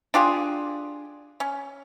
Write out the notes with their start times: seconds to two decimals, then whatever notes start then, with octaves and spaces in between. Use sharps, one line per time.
0.14 D4 F4 G4 G#4
1.40 C#4